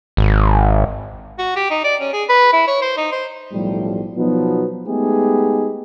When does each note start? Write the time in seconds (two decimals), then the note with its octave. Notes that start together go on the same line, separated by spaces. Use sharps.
0.17 G#1
1.39 F#4
1.56 G4
1.70 D#4
1.84 D5
2.01 C#4
2.13 G#4
2.29 B4
2.53 E4
2.67 C#5
2.82 C5
2.97 D#4
3.12 C5
3.53 B1 A2 F3 G3
4.17 B2 F3 F#3 B3 D#4
4.87 G#3 A3 B3 D#4 G4 G#4